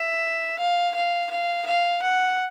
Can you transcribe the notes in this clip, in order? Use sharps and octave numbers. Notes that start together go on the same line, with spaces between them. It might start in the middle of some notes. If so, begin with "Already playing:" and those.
Already playing: E5
F5
F5
F5
F5
F#5